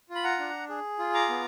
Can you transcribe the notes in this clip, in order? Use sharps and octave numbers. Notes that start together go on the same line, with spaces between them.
F4
B5
F#5 A#5
D4
G#4
F4
A#5 D6
B3